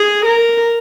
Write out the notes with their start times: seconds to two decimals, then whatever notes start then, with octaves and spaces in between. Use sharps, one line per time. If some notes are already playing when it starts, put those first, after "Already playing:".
Already playing: G#4
0.25 A#4